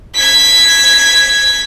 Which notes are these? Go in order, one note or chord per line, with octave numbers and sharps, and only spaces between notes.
G#6 B6